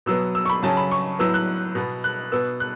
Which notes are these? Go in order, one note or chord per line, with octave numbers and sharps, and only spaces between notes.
B2 F#3 B3 E6
E6
C#6
B5
C#3 F#3 C#4 A5
B5
C#6
A2 F#3 B3 E6
F#6
B2 B3
F#6
B2 B3 E6
F#6